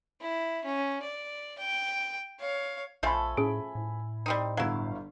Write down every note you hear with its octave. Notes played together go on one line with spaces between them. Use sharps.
E4
C#4
D5
G5
C#5 F5
A#1 F3 A3 A4 E5 G#5 B5
A2 C#4 G#4 D7
A2
G3 C4 D#4
G1 F#3 E4 F5